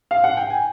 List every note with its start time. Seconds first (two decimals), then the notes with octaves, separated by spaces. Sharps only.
0.11 F5
0.24 F#5
0.37 G5
0.50 G#5